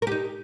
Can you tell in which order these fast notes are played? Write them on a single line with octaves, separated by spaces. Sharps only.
A#4 G4 D#4